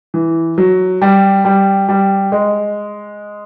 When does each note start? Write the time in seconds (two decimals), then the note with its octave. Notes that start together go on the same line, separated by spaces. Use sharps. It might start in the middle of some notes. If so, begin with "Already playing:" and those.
0.14 E3
0.58 F#3
1.02 G3
1.45 G3
1.89 G3
2.32 G#3